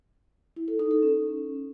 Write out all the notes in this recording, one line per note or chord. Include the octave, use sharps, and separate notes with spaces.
E4
A4
D#4
A4
C#4